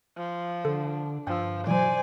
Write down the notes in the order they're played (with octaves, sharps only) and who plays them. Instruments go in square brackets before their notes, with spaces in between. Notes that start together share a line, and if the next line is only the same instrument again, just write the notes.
[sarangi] F3
[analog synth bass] D3 [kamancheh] D4 [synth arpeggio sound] A4
[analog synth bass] G2 [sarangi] F3 [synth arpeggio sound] G5 E6
[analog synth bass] B2 [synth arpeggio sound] E3 F#3 [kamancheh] C5 D5 [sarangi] G#5